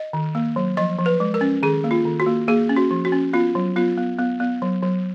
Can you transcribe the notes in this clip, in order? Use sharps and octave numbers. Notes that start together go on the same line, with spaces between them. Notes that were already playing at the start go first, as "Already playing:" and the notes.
Already playing: D#5
D#3
A#3
F#3
F3 D#5
F3
B4
G#3
A#4
C#4
D#3 G#4
A#3
F4
D#3
F#4
A#3
A#3 G#4
C#4
F#4
F3
F#4
C#4
B3 F4
F#3
B3 F4
B3
B3
B3
F#3
F#3